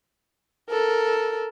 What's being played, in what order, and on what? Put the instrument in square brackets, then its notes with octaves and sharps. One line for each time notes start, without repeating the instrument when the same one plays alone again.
[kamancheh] A4 A#4